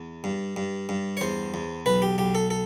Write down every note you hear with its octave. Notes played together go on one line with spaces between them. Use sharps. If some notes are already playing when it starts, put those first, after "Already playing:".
Already playing: E2
G2
G2
G2
C#5
E2 C5
E2
B1 B4
G4
B1 G4
A4
A4